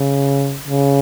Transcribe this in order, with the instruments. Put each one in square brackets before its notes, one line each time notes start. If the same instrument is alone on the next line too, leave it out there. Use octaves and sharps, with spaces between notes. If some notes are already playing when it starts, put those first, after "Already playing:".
Already playing: [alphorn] C#3
C#3